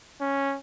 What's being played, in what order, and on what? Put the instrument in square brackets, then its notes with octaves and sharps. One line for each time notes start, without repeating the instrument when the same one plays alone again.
[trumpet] C#4